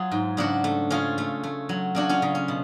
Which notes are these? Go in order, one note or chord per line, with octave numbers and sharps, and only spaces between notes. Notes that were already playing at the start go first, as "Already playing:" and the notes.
Already playing: F#3 F4 G#4
G#2
C#3 D4 F#4
A3
C#3 C#4 F4
A3
A3
F#3
C#3 D4 F#4
C#4 F4
C#3
C#4
B2